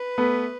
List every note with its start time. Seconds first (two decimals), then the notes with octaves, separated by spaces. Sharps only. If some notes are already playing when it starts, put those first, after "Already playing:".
Already playing: B4
0.18 A3 B3